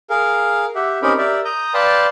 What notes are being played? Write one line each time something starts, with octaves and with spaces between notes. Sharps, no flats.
G#4 A#4 F5
G4 E5 F#5
C4 C#4 D#4 G4 A#4 B5
G4 A#4 D5 E5
A#5 D#6 G6
B4 D5 F5 G5 A5 C6